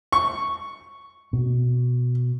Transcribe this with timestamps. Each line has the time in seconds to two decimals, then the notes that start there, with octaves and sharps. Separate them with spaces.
0.12 C#6
1.33 B2